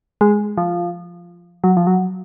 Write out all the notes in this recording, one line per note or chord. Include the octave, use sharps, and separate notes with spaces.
G#3
F3
F#3
F3
F#3